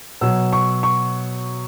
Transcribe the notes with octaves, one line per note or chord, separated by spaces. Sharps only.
B2 F#3 E6
C#6
C#6